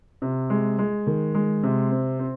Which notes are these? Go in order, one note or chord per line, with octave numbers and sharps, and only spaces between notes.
C3
G#3
G#3
D#3
G#3
C3
C4
C4